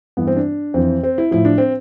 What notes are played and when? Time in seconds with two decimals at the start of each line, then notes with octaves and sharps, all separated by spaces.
0.17 G2 E3 B3
0.27 C4
0.37 D4
0.74 F2 E3 C4
1.03 C4
1.18 E4
1.31 A2 F3 E4
1.45 D4
1.58 C4